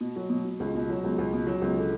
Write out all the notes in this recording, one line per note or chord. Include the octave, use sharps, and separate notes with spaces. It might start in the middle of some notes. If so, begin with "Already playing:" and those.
B2
F#3
B2
B2
C#2
B2
F#3
C#2
C#2
B2
F#3
C#2
D3